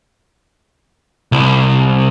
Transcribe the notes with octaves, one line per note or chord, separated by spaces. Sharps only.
C2